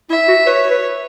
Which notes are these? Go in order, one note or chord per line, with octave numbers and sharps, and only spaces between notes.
E4 E5
F#4
B4 C#5
B4